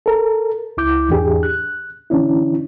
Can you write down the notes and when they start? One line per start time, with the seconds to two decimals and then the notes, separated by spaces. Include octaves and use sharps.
0.06 A4 A#4
0.77 C#2 E4 D6 G6
1.09 E2 G#2 E3 D4 G4 G#4
1.43 F#6
2.10 D3 E3 C#4 D4 E4